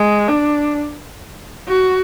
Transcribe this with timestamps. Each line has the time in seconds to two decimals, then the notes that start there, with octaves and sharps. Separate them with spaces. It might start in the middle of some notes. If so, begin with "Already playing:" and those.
Already playing: G#3
0.29 D4
1.68 F#4